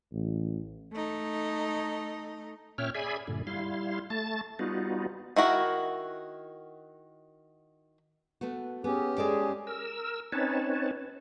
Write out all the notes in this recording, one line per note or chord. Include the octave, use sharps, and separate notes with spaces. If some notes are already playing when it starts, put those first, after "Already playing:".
A1
A3 D#4
A#2 C#4 C#5 E5 G5 F6
G#4 D5 E5 G#5 B5
G2 A#2 D3
G3 E4 F5 C6
A3 A5 A6
G3 B3 D#4 F4 F#4
D#3 E4 F#4 A#4
A3 B3 F#4
B3 C#4 G4 G#4
G#3 G#4 A4 D5
A#4 E6
C4 C#4 D#4 B4 C#5 A5